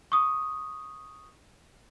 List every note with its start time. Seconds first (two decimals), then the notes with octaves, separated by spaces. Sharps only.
0.12 C#6 D#6